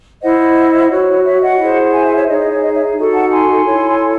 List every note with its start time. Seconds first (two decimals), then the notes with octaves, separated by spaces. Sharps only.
0.21 E4 C5 D#5 F#5
0.90 F#4 C#5
1.25 C#5 E5
1.42 D#5 F#5
1.59 E4 G#4 C5
1.93 E5 G#5
2.05 E5 G#5
2.16 C#5 E5
2.28 D#4 G#4 C#5 D#5
2.39 D#5
2.51 C#5
2.62 D#5
2.74 C#5 E5
2.96 D#4 F#4 A4
3.13 F#5 A5
3.31 G#5 C6
3.65 E4 A4 C#5